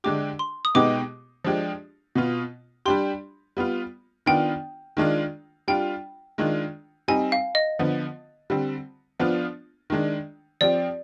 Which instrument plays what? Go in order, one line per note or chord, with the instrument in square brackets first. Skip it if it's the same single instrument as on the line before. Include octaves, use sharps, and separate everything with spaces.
[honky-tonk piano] D3 G#3 D4 G4 [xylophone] D6
[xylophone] C6
D#6
[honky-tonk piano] B2 G#3 B3 D#4 G4 [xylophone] D6
[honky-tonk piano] F3 G#3 D4 G4
B2 B3 F4
[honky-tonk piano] G3 D4 G4 [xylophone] C6
[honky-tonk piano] G3 B3 F4
[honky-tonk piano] D#3 B3 D4 F4 [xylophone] G5
[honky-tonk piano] D#3 G#3 D4 F4
[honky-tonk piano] G3 D4 F4 [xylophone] G5
[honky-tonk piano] D#3 G#3 D4 F4
[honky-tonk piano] G3 C4 D#4 [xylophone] G#5
[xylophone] F5
D#5
[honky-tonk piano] D3 F3 B3
D3 G3 C4
F3 B3 D4 F4
D#3 G#3 D4
[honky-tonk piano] F3 C4 G4 [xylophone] D5